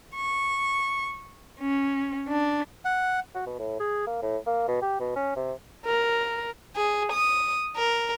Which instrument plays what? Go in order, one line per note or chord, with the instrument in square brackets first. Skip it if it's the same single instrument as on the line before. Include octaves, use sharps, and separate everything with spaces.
[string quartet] C#6
C#4
D4
[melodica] F#5
[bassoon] F#4
B2
A2
G#4
A#3
A2
A#3
B2
G4
B2
C#4
C3
[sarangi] A#4
[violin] G#4
D#6
A#4